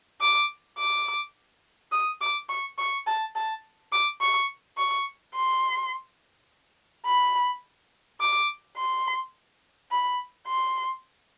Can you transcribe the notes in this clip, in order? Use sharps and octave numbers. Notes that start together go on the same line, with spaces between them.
D6
D6
D#6
D6
C#6
C#6
A5
A5
D6
C#6
C#6
C6
B5
D6
C6
B5
C6